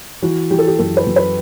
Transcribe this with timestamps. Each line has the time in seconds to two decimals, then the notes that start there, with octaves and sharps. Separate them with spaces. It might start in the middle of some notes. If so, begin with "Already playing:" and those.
0.22 E3 F#4
0.51 E3 G4
0.59 A4
0.67 G4
0.79 F#2 A4
0.97 B4
1.07 F#2
1.16 B4